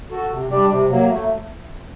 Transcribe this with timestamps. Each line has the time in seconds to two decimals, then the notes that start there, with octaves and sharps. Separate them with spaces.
0.11 F#4 A4
0.31 C3
0.50 G3 D4 G4 D5
0.70 C3
0.89 F#3 A#3
1.09 A3